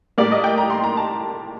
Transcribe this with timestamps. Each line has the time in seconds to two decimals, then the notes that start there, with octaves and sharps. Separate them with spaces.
0.18 A2 G3 A#3 D5
0.32 D#5
0.44 G5
0.58 A#5
0.70 C6
0.84 A#5
0.97 A5